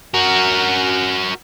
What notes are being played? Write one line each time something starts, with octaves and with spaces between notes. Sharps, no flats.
F#4 A#4